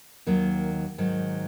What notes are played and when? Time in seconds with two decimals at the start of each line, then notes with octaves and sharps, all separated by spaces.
0.27 D#2 D#3 F#3 A#3
0.98 G#2 D#3 F#3